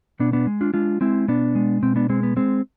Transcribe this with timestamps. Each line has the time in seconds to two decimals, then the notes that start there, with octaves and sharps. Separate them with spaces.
0.20 B2 B3 D4
0.33 B3 D4
0.47 G#3
0.61 D4 F4
0.74 G#3 D4 F4
1.01 G#3 C4 E4
1.28 B2 B3 D4
1.55 G#3
1.83 B2 C4
1.96 B3 D4
2.10 G#3 C4
2.23 B3
2.37 G#3 C4